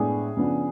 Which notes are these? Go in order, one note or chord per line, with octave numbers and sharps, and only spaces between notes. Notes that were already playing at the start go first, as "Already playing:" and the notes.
Already playing: A2 G#3 B3 D4 G#4
C#3 F3 B3 D4